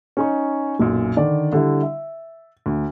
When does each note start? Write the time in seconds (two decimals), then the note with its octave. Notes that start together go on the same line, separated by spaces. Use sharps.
0.17 C#4 D#4 C#6
0.79 B1 F#2 A#2
1.16 D3 D#3 D5
1.53 D3 G3 E4
1.82 E5
2.66 D2